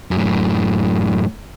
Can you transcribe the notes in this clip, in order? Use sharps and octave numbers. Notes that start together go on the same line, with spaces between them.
F#2 A2